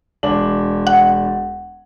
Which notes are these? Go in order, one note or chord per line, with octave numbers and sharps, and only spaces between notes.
E1 D4 F#7
F#5